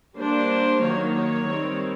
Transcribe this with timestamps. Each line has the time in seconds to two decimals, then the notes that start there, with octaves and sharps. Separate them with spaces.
0.17 G3 A#3 D4 C5
0.82 D#3 F#3 A#3 C#5
1.15 C#5
1.47 D#3 G3 C4